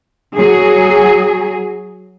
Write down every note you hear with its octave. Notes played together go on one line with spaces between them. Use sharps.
F#3 G#4